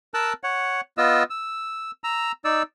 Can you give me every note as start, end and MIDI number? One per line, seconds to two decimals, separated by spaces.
0.14 0.33 70
0.14 0.33 81
0.14 0.33 88
0.14 0.33 90
0.44 0.81 73
0.44 0.81 78
0.98 1.23 59
0.98 1.23 65
0.98 1.23 75
0.98 1.23 88
1.30 1.91 88
2.04 2.32 82
2.04 2.32 88
2.45 2.62 63
2.45 2.62 74
2.45 2.62 88